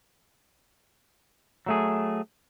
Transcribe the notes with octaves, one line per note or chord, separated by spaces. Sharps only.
F#3 A3 G#4